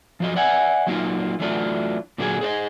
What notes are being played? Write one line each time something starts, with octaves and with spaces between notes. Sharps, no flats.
F3 F#3 D#5
D5 E5 F#5 G#5
F#3 A#3 D#4 F4
E3 F#3 A3 D4 E4 F4
A#2 D3 F#3 A#3 E4 G#4
G#4 C5 D5 D#5